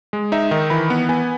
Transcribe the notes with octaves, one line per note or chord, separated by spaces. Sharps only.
G#3
D#4 E5
D#3
E3 B5
B3
B3 G#5